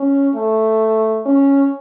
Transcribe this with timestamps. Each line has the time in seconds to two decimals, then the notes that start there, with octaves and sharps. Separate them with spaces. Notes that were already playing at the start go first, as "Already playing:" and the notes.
Already playing: C#4
0.35 A3
1.26 C#4